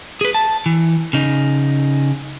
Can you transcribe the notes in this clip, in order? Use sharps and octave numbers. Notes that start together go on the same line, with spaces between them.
G#4 B4
A5
E3
C#3 D#4